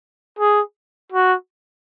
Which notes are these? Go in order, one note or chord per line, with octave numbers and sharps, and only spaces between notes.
G#4
F#4